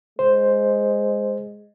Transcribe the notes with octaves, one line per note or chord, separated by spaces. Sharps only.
G#3 C5